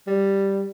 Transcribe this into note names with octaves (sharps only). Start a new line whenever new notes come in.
G3